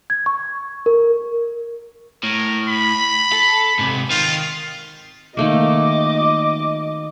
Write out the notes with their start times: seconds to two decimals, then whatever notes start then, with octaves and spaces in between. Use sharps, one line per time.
0.10 G#6
0.26 C#6
0.86 A#4
2.24 A2 A#4
2.68 B5
3.32 A4
3.79 G#2 C3
4.10 D#3 F4
5.37 D#3 A3 A#3 D#5 D6